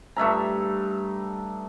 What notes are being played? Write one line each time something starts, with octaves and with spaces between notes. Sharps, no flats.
G2 A3 E5 A#5